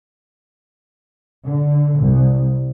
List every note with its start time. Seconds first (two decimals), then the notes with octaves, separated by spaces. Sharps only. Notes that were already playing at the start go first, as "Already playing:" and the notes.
1.45 D3
1.98 C2